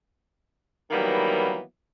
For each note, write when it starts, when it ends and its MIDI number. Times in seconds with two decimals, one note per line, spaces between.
0.91 1.60 51
0.91 1.60 52
0.91 1.60 54
0.91 1.60 55
0.91 1.60 58
0.91 1.60 59